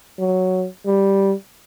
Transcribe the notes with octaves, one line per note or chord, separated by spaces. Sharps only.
F#3
G3